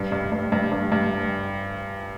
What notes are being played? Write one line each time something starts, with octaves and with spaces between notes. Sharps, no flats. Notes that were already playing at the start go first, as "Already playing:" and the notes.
Already playing: G2
G2
G2
G2
G2
G2